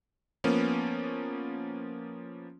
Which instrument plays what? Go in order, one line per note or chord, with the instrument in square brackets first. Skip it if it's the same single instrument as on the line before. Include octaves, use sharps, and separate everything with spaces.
[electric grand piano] F3 A#3 B3 C#4